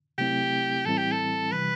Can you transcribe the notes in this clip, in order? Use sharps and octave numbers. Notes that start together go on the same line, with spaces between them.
C3 F#3 A3 C4 E4 G4
A2 E3 G3 C4 E4 A4
G4
A4
C3 E3 G3 B4